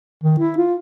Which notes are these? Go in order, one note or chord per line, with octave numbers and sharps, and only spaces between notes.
D#3
E4
F4